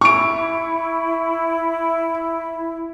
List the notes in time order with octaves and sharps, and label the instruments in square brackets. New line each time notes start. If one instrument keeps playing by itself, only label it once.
[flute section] E4 [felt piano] C#6 D7